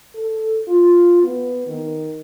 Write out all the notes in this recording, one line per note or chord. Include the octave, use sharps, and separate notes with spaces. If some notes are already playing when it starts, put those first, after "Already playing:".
A4
F4
B3
D#3